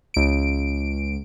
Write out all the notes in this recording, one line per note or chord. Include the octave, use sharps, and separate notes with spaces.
C#2 D7